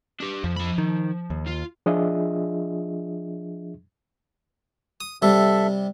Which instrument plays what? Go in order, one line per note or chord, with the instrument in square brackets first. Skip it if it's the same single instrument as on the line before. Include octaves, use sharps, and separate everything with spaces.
[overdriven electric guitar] D4 G4
[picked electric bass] F2 [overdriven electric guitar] F3
[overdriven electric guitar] F3 B5
[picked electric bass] D#3
D#2
[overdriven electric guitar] F4
[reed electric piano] F3 D4 F4 G#4 D#5 E5
[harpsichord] D#6
[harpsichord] C3 G3 [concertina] A4 E5